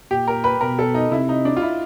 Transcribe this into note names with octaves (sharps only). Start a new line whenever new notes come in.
A#2 G4
A#4
B4
B2 A#4
A4
D#4
C3 E4
D#4
D4
F4
E4